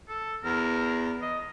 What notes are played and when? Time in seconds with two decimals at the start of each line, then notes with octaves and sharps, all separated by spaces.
0.09 A4
0.44 E2 A#4
1.22 D#5